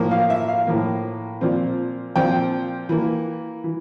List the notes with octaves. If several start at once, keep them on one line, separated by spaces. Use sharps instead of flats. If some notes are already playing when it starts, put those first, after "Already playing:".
Already playing: A2 F3 A#3
F5
E5
F5
A2 F3 A#3
A#2 F3 C4
A#2 F3 C4 G5
E3 A#3
E3